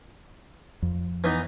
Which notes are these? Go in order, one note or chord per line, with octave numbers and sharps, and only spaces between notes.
F2
E3 B3 D#4